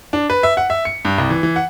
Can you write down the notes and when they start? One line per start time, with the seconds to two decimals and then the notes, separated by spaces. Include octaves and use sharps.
0.13 D4
0.30 B4
0.43 E5
0.57 F#5
0.70 E5
0.85 C#7
1.05 G2
1.18 C2
1.30 E3
1.43 E3
1.56 F#5